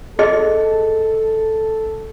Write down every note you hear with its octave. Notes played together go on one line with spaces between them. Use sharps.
D#4 G#4 A4 D#5